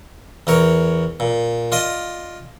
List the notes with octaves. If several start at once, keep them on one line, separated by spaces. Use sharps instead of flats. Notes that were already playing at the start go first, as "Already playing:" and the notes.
E2 A#4 C#5
A#2
F4 D5 D#5